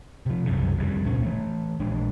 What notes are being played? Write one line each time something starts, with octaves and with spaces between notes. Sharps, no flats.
C3 F3
C2 F#2 C#3
F1 F2 B2 G3
C#2 A#2 C#4
E3 A3
A#1 G#3 D4